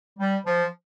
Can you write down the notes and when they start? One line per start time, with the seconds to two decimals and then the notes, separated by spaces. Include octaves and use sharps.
0.19 G3
0.46 F3